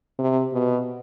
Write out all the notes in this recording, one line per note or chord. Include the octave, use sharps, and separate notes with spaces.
C3
B2